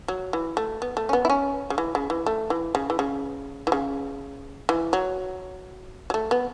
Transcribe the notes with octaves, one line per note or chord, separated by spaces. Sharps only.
F#3
E3
A3
B3
A3
C#4
B3
E4
C#4
C#3
E3
C#3
E3
A3
E3
C#3
E3
C#3
E3
C#3
E3
F#3
F#3
A3
B3